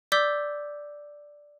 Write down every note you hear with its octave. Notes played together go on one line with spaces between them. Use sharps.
D5 D6 E6 G6 B6 G7